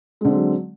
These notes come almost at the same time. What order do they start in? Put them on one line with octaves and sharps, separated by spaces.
G#3 D3 C4 F#3